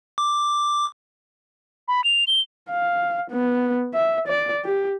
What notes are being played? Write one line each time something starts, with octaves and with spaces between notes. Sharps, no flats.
D6
B5
F7
G7
F5
B3
E5
D5
G4